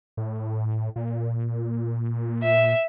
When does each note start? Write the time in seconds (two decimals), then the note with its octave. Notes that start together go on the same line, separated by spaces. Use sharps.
0.17 A2
0.96 A#2
2.42 E5